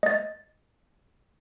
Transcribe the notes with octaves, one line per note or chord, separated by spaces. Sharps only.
D#5 A6